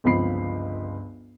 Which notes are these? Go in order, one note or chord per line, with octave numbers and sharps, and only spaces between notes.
G1 C#2 F3 C4 B5 C7